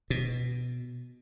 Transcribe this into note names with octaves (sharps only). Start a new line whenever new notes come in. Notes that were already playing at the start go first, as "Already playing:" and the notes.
B2